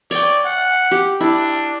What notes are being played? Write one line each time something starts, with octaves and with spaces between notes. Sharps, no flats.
C#5 D5 G5
F#5
G4
D4 E4